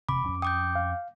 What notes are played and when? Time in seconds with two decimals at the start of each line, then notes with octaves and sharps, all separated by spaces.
0.09 E1 C3 B5 D6
0.26 F2 C#4
0.42 G5 D6 D#6 G6
0.76 F5